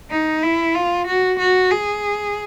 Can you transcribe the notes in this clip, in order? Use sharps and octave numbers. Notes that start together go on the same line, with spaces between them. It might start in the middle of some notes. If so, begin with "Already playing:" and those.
D#4
E4
F4
F#4
F#4
G#4